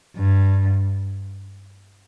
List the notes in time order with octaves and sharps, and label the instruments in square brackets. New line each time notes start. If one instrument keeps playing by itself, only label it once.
[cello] G2